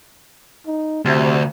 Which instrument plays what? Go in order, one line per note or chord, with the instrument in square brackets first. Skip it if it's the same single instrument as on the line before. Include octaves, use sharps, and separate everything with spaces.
[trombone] D#4
[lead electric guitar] D2 [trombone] C3